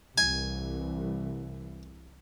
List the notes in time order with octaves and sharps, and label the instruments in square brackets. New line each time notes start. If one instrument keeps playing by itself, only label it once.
[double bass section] C2 E3 [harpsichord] G#5